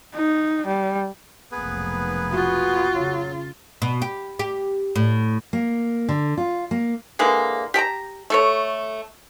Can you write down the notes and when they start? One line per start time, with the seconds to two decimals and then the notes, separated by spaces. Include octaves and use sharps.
0.15 D#4
0.67 G3
1.52 F1 B1 A#3 B3 G#4 B4
2.32 F4 F#4
2.94 C#3 F#3
3.82 B2
4.02 G4
4.39 G4
4.96 A2
5.53 A#3
6.09 D3
6.37 F4
6.71 A#3
7.19 D3 E3 G#3 A#3
7.74 G4 G5 A5 A#5
8.30 A3 A4 C#5